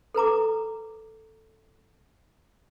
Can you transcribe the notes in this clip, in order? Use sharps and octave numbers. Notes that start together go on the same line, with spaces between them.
A4 B4 A#5 D6